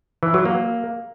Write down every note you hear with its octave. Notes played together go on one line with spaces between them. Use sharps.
E3
F#3
A#3